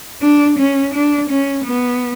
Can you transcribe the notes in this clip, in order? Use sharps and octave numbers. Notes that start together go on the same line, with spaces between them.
D4
C#4
D4
C#4
B3